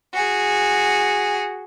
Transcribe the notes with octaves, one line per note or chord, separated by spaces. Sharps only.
F#4 G#4